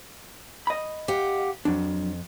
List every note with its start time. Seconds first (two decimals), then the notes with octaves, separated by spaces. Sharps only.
0.67 D#5 B5
1.08 G4 F5 F#5
1.65 F2 F#3 D4